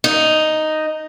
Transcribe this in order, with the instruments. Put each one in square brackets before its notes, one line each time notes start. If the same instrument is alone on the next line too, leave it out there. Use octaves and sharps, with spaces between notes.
[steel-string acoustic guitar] D#4